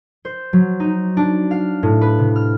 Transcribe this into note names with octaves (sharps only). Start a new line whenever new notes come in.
C5
F#3
D#4
D4
F5
A2
B4
C3
F6